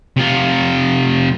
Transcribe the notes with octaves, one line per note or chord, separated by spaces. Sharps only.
C3 F4